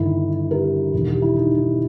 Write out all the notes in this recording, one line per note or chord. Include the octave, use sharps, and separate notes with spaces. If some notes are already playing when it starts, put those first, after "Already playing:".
Already playing: G1 G2 D#3 E4
G4 A#4
E1 E2 D#3
G4
E4
D#4
D#4